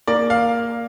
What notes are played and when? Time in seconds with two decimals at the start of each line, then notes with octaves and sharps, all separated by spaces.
0.08 A#3 D5
0.30 F5